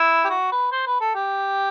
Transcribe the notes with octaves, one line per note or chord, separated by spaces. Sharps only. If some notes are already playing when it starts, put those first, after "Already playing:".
Already playing: E4
G4
F#4
B4
C5
B4
A4
G4